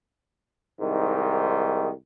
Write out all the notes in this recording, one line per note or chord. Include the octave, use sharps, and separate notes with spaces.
C2 G#2 D#3